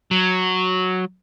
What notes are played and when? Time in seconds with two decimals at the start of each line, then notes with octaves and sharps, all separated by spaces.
0.11 F#3